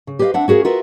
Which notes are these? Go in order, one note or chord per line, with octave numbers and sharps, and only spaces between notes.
C#3
G4 B4 C5 D5 D#5 F5
C4 D4 E5 F#5
C#4 F#4 G#4 A#4 F5
F4 F#4 A#4 B4 E5